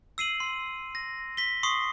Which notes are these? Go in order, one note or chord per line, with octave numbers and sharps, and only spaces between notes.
E6 C7 D#7 F#7
C6
A#6
B6 G7
C6 C#6 D#6 C7 G7